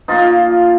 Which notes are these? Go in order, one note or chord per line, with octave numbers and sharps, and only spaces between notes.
A#2 F3 D#4 F4